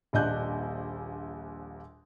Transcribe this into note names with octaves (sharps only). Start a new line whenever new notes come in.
D#1 A#1 D4 D#5 F#6 G6